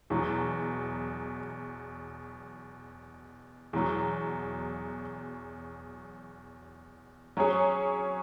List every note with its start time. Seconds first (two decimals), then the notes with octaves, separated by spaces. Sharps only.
0.10 E2 B2 F#3
3.73 E2 B2 F#3
7.37 F#3 C#4 G#4 C#5